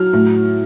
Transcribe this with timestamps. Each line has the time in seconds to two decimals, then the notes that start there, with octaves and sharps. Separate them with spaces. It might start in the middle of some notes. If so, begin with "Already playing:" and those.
Already playing: F#3 F6
0.13 A2